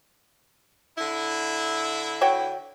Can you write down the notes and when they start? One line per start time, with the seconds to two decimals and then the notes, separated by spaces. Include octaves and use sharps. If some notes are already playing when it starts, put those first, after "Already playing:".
0.98 D3 E4
2.21 F#4 C#5 G5